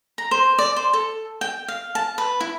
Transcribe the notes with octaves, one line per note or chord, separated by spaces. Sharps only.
A#5
C5
D5
C5
A4
G5
F5
A5
B4
E4